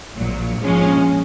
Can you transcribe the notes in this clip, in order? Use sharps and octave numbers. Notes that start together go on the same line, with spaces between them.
A#1 A#2 F#3
A#1 G#2 F3 G#3 C#4